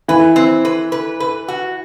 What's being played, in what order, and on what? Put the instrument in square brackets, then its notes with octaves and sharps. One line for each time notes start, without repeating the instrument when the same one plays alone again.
[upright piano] E3 [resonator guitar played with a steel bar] B4
[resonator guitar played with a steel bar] C4
B4
B4
B4
F#4